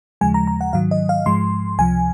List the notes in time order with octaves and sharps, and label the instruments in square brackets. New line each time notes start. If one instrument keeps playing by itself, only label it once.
[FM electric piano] D#2 C#3 F3 G#3 G#5
A#5
A#5
F#5
G#2 D#3 F#3 F5
D#5
F5
G#2 F3 G#3 C6
C#2 C3 F3 G#5